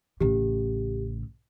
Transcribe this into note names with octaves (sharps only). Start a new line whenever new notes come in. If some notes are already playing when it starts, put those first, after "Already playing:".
A1 C#3 G4